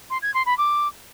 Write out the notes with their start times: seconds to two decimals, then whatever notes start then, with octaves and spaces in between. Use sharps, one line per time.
0.10 C6
0.22 G#6
0.34 C6
0.46 B5
0.58 D6